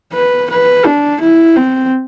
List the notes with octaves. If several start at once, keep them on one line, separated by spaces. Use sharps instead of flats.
B4
B4
D4
E4
C4